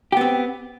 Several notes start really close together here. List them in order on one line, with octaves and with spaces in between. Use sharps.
G4 B3 C4